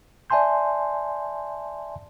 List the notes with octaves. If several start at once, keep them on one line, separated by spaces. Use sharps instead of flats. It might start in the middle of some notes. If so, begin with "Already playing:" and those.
D5 E5 G#5 A5 C6 G6